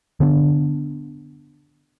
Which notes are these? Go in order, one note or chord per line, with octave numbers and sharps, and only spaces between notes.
D3 B3 D4